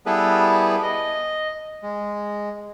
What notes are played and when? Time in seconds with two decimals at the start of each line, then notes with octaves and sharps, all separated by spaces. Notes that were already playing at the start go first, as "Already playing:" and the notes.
0.06 G3 B3 E4 G#4 A4 B4
0.82 D#5
1.83 G#3